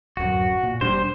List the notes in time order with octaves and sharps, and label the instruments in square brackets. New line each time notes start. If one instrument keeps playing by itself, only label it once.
[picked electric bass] D1 F#2 [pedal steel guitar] F#4
[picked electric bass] A#2
[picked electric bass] E1 G3 D4 [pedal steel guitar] C5